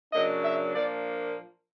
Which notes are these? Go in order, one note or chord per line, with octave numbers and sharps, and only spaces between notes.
C#3 F#3 A#3 D4 D#5
E5
A#2 F3 A#3 D4 D5